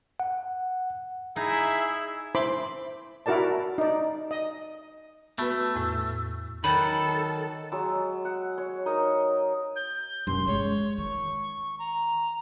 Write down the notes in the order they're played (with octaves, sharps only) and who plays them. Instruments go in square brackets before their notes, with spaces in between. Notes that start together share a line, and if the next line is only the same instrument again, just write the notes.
[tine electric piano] F#5
[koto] D#4 [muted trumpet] E4 [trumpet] G#4 [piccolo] E5
[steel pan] E4 C5 B5 C6 D6
E4 F#4 A#4 D5 A5
D#4 D5
D#5
[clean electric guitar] A3 [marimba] B3 F#4 B4
[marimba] E2 A2
[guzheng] D#3 F#3 F#5 [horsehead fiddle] A4 [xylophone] B5
[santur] F#3 G#3 E6
F#5
C#5
D#4 A#4 D#5 D#6
[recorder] G6
[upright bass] F#2 [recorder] C6
[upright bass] G#3 [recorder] C#5
[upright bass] D#3 [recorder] C#6
[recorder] A#5